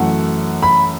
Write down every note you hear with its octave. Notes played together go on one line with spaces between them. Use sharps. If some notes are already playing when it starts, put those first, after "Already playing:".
Already playing: F#2 E3 A3 F#5
B5